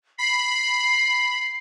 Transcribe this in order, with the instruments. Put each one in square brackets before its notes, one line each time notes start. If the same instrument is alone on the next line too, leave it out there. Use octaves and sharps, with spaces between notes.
[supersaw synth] B5 [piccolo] C7